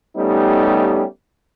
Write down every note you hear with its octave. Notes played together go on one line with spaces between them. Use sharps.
G3 A3 B3 C#4 D#4 G4